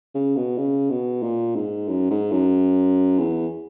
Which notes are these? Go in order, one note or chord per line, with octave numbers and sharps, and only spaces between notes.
C#3
B2
C#3
B2
A#2
G#2
F#2
G#2
F#2
E2